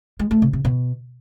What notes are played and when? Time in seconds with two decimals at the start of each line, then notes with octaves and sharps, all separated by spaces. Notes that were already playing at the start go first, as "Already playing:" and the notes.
0.19 G#3
0.31 A3
0.42 C3
0.53 C3
0.65 B2